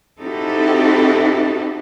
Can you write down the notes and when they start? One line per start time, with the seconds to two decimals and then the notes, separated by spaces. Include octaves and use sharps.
0.20 C4 D#4 E4 F#4 G4 A4